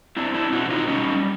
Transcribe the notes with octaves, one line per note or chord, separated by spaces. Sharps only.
C4 D4 E4
D4 E4
B2 E4 F#4
D#4 F4
G3 C#4 D#4